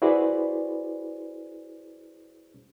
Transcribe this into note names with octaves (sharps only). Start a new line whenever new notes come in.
E4 F#4 G#4 B4 C5 D5